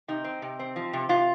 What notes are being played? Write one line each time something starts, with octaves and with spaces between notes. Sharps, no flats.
C3 D#4
C4
C3
C4
F3
C3
C3 F4